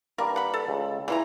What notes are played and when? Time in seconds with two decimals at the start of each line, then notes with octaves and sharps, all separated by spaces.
0.18 G2 A#3 A#4
0.36 F#5 B5
0.54 A4
0.68 C#2
1.08 A#2 E3 E4 A#5